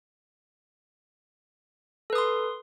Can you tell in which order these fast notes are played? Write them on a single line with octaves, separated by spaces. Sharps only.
A4 B4 D#6 C6